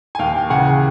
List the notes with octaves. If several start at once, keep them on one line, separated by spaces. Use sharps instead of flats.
G#5
D#2 F5 G5
C#3 E3 F#5 G#5